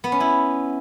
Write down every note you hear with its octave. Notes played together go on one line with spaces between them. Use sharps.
B3
C#4
E4